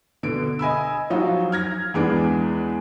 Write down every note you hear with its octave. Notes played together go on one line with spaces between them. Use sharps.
B2 D3 D7
D#5 G#5 B5 E6
F3 F#3 D#4 F4 F#4
F6 G#6 A#6
E2 G#3 B3 D4